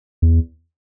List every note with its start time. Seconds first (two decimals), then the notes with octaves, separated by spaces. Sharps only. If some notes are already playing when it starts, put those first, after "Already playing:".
0.22 E2